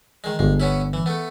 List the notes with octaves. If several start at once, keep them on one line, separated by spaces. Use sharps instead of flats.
D#3 G#3
G1 G#3
B3 C#4 E4
E3
A3 B3